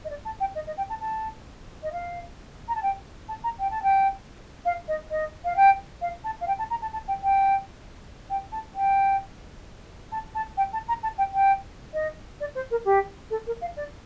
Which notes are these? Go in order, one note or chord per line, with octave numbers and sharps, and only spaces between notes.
D#5
D5
A5
G5
D#5
D#5
G5
A5
A5
D#5
F5
A#5
A5
G5
A5
A#5
G5
A5
G5
F5
D#5
D#5
F5
G5
F5
A5
F5
G5
A5
A#5
A5
A5
G5
G5
G5
A5
G5
A5
A5
G5
A5
A#5
A5
G5
G5
D#5
D5
C5
A#4
G4
A4
A#4
F5
D5